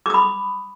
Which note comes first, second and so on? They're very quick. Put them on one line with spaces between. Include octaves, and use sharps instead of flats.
D6 D#6 B5